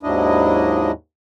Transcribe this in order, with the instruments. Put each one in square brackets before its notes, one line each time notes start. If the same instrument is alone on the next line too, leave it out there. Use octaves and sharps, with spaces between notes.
[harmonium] D#2 G#2 F#3 D4 E4 D#5